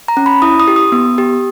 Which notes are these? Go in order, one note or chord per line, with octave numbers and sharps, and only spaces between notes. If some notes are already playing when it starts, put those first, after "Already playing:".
A#5
C#4
B5
E4 D#6
D#6
G4
D#6
B3
G4